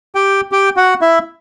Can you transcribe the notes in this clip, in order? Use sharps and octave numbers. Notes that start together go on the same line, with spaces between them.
G4 G5
G4 G5
F#4 F#5
E4 E5